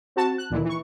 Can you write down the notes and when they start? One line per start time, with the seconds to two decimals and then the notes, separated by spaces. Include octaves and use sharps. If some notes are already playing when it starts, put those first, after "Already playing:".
0.16 C4 F#4 A5
0.38 F#6
0.50 D2 A#2 D#3 E3
0.65 E3 C#6